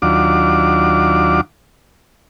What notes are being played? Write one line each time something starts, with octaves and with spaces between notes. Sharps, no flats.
D#2 F#3 D4 F4 D6